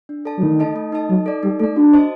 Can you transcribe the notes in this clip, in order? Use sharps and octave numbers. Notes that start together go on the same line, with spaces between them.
D4
A4 D5 A5
F#3
D#3 A3
D#4 A4 D#5 A5
A3
D#4 A4 D#5 A5
F#3 D#4
A4 D5
G3 D#4
A3 A4 D5
D4 F#4
C5 D#5 A5